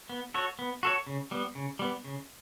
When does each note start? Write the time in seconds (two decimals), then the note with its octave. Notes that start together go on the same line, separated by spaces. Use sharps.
0.09 B3
0.34 F#4 A4 C#5
0.59 B3
0.83 F#4 A4 C#5
1.07 C#3
1.31 G3 B3
1.55 C#3
1.79 G3 B3
2.04 C#3